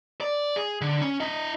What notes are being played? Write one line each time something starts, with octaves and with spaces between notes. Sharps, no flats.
D5
G#4
D3
C#4
E4 D#5